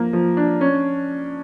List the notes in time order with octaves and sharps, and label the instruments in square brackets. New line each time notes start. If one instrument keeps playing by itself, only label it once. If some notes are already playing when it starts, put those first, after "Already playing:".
Already playing: [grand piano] F3 A#3
F3
D4
C#4